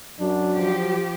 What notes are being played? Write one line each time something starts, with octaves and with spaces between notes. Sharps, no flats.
F#2 F#3 D4
F3 G4